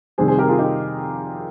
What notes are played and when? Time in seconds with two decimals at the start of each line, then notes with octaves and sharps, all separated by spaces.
0.18 F2 C3 D#3 G3 G#4 C5
0.28 G#4 C5
0.38 G4 A#4
0.48 F4 G#4
0.58 D#4 G4